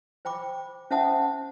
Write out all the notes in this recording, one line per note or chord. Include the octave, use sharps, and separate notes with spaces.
C5 G5 B5 D6
C#4 C5 E5 F#5 A5 D#6